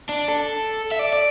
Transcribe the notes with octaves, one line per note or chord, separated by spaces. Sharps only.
D4
A4
E5
D5
D5